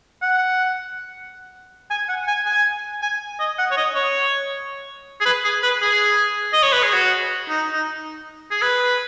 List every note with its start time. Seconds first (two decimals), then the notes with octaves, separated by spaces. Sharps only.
0.22 F#5
1.90 G#5
2.09 F#5
2.27 G#5
2.46 G#5
3.02 G#5
3.39 D#5
3.58 F#5
3.71 C#5
3.77 D#5
3.95 C#5
5.20 G#4
5.26 B4
5.44 G#4
5.63 B4
5.82 G#4
6.53 D#5
6.63 C#5
6.73 B4
6.83 G#4
6.93 F#4
7.49 D#4
7.73 D#4
8.51 G#4
8.62 B4